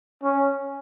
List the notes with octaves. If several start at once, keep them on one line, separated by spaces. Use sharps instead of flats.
C#4